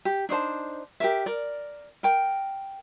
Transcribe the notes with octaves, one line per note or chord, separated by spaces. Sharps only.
G4
D4 D#4 C5 A5
G4 A#4 E5
A#4 D5
A#4 G5